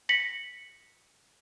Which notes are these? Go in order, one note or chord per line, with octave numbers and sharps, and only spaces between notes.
A#6 B6 C#7 F#7